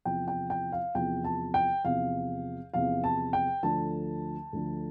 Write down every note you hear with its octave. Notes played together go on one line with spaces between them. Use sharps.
E2 C3 F3 G5
G5
G5
F5
E2 C3 F3 G5
A5
G5
E2 C3 F3 F5
E2 C3 F3 F5
A5
G5
D2 D3 F3 A5
D2 D3 F3